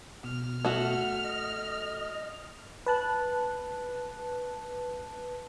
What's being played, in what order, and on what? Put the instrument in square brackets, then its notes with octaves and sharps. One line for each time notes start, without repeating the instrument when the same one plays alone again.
[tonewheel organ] B2 [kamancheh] F6
[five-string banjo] A3 F#4
[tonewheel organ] D#5
[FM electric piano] B4 A5 F#6